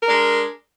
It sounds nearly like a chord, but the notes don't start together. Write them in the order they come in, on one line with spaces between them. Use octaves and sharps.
A#4 D4 G#3